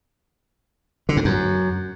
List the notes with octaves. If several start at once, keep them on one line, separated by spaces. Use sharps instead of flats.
D3
G#2
F#2